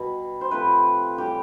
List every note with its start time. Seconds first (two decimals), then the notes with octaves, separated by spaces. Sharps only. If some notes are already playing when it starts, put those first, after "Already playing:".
Already playing: B2 G3 B3
0.41 C5
0.51 C3 F3 A3 B4
1.18 A2 E3 G3 G4